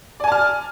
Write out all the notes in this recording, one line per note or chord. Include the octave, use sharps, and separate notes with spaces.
D5 G#5 A5 F6